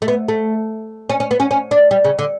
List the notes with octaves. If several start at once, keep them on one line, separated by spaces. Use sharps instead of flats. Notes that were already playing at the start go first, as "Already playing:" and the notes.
A3
B3
A3
C#4
C#4
B3
C#4
C#4
D4
G3
C#3
D3